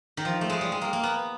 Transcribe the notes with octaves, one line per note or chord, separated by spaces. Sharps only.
D#3
F3
A3
G#3
G3
G#3
A#3
A#3
B3